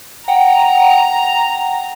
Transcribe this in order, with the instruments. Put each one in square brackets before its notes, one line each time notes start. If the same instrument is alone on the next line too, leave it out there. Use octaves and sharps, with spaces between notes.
[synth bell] F#5 G5 [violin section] A#5